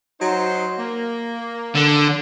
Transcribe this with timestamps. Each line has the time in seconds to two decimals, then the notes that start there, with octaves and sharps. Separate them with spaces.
0.21 F#3 D#4 C5
0.79 A#3
1.75 D3